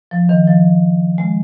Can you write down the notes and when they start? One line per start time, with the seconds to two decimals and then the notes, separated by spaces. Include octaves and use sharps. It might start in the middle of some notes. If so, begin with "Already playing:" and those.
0.11 F3
0.29 D#3
0.47 F3
1.18 G#3